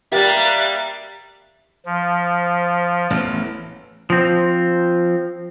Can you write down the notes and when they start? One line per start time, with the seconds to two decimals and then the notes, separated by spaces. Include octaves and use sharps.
0.12 G3 A#3 G4 E5 F#6 A6
1.86 F3
3.10 A1 E2
4.10 F3 C4